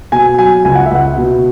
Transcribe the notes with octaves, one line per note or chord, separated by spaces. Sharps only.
B2 G#5
F#3 G#5
C#2 G#5
F#5
E5
C#2 F#5
B2